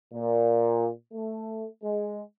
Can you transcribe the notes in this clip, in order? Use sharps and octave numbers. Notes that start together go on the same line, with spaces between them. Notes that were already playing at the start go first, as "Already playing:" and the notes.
A#2
A3
G#3